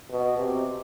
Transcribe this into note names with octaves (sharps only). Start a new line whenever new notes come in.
B2
C3